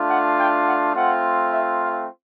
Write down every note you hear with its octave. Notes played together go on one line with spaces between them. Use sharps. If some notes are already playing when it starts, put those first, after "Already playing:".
Already playing: A3 D4 F4
F#5
G5
F#5
A3 C4 F4 F#5
E5
F5